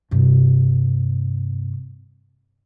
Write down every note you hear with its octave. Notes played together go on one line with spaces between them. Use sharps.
G2 C3